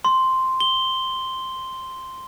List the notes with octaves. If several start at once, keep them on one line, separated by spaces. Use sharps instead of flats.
C6
G7